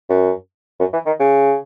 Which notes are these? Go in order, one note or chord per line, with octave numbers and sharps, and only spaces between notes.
F#2
F#2
E3
D#3
C#3